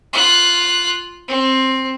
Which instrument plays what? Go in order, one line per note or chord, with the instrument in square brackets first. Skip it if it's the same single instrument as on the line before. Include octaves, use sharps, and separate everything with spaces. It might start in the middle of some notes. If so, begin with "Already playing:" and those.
[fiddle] F4 F#6
C4